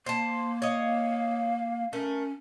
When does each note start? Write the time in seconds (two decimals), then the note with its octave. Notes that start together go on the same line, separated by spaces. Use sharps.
0.06 A#3 C5 A5
0.62 C#5 D#5 F5
1.93 A3 C#4 A#4